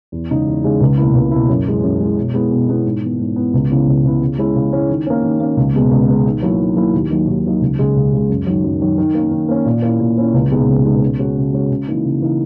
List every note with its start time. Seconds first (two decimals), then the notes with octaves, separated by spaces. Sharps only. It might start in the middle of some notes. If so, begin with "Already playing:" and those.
0.12 E2
0.30 C#3 G#3 D#4
0.47 E2
0.64 C#3 G#3 D#4
0.81 C#2
0.98 B2 A#3 E4
1.15 C#2
1.31 B2 A#3 E4
1.49 F#2
1.65 E3 G#3
1.84 F#2
2.00 E3 G#3
2.17 B2
2.34 G#3 B3 E4
2.51 B2
2.68 G#3 B3 E4
2.85 G#2
3.02 E3 B3
3.19 G#2
3.36 E3 B3
3.54 C#2
3.70 C#3 E3 B3 E4
3.87 C#2
4.04 C#3 E3 B3 E4
4.21 C#3
4.38 G#3 C#4 E4
4.56 C#3
4.73 G#3 C#4 E4
4.89 D#3
5.07 A#3 C#4
5.23 D#3
5.40 A#3 C#4
5.57 C#2
5.74 B2 G#3 B3
5.91 C#2
6.08 B2 G#3 B3
6.25 D#3
6.42 F#3 A#3 E4
6.59 D#3
6.76 F#3 A#3 E4
6.94 D#2
7.11 D#3 F#3 A#3 D#4
7.28 D#2
7.45 D#3 F#3 A#3 D#4
7.61 C#2
7.79 C#3 G#3
7.96 C#2
8.13 C#3 G#3
8.29 F#2
8.47 D#3 F#3
8.64 F#2
8.81 D#3 F#3
8.98 D#3
9.15 A#3 C#4
9.31 D#3
9.49 A#3 C#4
9.65 A#2
9.82 A#3 C#4 E4
10.00 A#2
10.17 A#3 C#4 E4
10.34 C#2
10.51 B2 G#3 B3 D#4
10.69 C#2
10.85 B2 G#3 B3 D#4
11.02 C#3
11.19 G#3 C#4 F#4
11.37 C#3
11.53 G#3 C#4 F#4
11.71 C#3
11.88 E3 A#3 D#4
12.05 C#3
12.21 E3 A#3 D#4